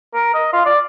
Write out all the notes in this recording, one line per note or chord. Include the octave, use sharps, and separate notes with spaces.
A#4
D#5
F4
D5